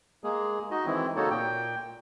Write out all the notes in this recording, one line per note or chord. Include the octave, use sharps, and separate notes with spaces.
G#3 A#3 G#4
D#4 F#4 D#5
D#3 E3 G#3 C4 E4
C#3 A#3 D#4 F#4 A4 C#5
A#2 G5